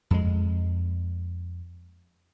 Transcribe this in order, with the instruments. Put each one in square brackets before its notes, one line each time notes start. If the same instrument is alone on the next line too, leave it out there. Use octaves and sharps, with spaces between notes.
[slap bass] F2 G#3